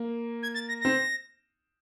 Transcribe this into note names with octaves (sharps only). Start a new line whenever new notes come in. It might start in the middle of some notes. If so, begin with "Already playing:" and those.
Already playing: A#3
G#6
A6
A#6
C4 A#6